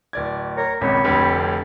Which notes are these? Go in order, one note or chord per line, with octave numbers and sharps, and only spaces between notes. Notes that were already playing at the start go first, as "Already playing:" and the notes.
D1 D5 G#6
A#4 C#5 A#5
G#1 C#2 A#2 C4 C#5 B5
F1 D2 G4